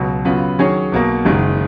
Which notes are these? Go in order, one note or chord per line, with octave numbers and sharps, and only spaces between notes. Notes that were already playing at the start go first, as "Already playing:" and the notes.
Already playing: C#2 B2 F#3
C#3 F#3 B3 F4 B4
D#3 F#3 C#4 G#4 C#5
B1 B2 A#3
F#1 F#2 D#3 G#3